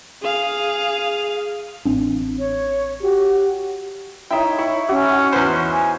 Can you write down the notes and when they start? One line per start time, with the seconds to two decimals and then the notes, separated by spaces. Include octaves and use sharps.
0.23 G#4 F5
1.85 A1 C4 D4
2.39 C#5
3.02 F#4 G4
4.30 D#4 E4 C#5 E5 G5
4.58 E4 C#6
4.89 C#4 F#4
5.33 E2 B4 C5
5.71 G#5